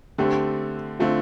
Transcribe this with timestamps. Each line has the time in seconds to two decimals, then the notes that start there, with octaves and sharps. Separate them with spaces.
0.18 D3 A3 C4 G4
0.99 D3 A3 C4 F4